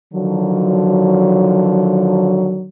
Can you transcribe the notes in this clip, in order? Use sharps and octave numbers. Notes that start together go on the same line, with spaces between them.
D3 D#3 F3 F#3